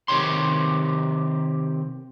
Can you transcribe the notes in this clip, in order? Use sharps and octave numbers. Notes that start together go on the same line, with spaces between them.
C3 D#3 G4 C#5 C6